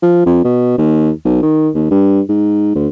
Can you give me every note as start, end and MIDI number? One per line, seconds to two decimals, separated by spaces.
0.02 0.24 53
0.26 0.43 41
0.44 0.75 47
0.78 1.10 39
1.25 1.41 35
1.43 1.69 51
1.74 1.90 39
1.91 2.21 43
2.29 2.71 44
2.75 2.88 38